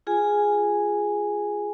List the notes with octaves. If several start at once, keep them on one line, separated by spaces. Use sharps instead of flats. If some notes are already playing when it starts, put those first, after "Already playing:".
F4 G#4 G#5